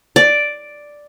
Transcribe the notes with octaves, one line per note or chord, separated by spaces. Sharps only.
D5